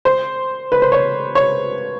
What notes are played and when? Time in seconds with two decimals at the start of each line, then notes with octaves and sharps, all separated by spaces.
0.05 C5
0.72 B4
0.82 C5
0.92 C#5
1.35 C#5